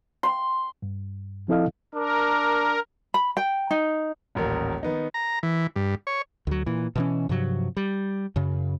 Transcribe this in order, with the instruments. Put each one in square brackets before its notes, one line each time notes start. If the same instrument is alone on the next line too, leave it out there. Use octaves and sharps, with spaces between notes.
[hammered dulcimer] C6
[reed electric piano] G2
F3 C4 E4 A4 D#5 F5
[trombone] D4 [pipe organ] A#4
[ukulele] B5
G5
D#4
[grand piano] D#1 A1 A#4
D#3 B3 D#4
[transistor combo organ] A#5
E3
G2
C#5
[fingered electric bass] D2 F#3
A#2 E3
B2 E3 C#4
G2 C3 F3 F#3
G3
F#2 C#3